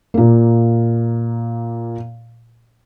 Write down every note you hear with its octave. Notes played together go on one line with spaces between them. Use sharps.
A#2 A#3